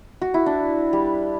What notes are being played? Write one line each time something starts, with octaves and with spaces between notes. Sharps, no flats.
F#4
E4
D4
G3